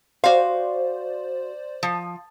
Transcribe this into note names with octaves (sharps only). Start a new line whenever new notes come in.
F#4 C5 D5 F5
F3